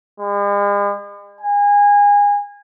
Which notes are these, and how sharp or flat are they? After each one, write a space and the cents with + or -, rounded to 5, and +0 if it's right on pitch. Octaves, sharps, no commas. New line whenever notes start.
G#3 -45
G#5 -25